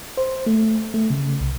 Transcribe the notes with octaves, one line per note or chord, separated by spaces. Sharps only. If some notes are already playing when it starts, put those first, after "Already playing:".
C5
A3
A3
C#3
C2